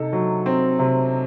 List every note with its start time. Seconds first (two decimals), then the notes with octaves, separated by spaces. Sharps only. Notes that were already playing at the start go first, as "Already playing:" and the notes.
Already playing: C3 D#4 A4
0.13 F#3
0.46 C4
0.79 C3